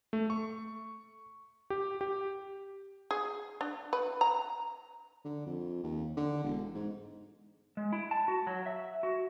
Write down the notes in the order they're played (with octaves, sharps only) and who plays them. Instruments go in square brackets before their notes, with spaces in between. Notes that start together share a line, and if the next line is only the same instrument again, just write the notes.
[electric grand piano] A3
C#6
G4
G4
[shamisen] G#4
D4
B4
A#5
[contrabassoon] D3
F2
D#2
D3
E1
G#2
[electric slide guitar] G#3
E4
A5
F#4
F#3
E5
F#4